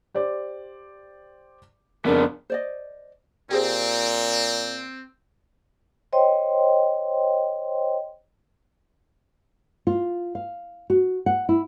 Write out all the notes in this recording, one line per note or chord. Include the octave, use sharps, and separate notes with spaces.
G4 C5 D5
F2 C#3 B3 D4 A#4
C5 D5 D#5
A#2 C4 G4 G#4 C5
C5 C#5 D#5 G5 C6
F4
F5
F#4
F#5
E4